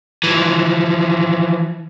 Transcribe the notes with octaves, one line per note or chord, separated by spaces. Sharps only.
E3 F3